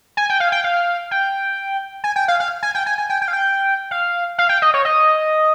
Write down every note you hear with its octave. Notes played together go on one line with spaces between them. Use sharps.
G#5
G5
F5
G5
F5
G5
G#5
G5
F5
F5
G#5
G5
G#5
G#5
G5
G5
F5
G5
F5
F5
G5
D#5
C#5
D#5